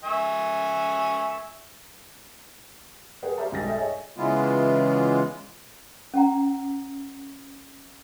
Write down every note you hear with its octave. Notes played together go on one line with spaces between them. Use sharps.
E5 G#5 C#6
G#4 A#4 B4 F#5 G5
G4 C5 D5 E5 F5 A5
B1 G2 G#3 G5 A6 A#6
A4 D5 E5 G5
G#4 C#5 D#5 E5 G#5
C#3 E3 G#3 B3 F4
C#4 F#5 A#5